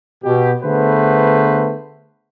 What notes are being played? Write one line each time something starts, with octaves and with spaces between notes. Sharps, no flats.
B2 G4
D3 A3 B3 G#4 B4 C5